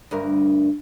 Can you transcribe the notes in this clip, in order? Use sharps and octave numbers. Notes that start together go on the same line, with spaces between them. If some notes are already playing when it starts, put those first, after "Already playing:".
D2 G2 A#4